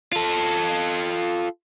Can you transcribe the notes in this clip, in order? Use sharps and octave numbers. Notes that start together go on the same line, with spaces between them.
F4 A4